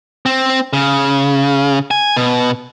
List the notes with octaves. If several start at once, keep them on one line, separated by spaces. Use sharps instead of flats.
C4
C#3
G#5
B2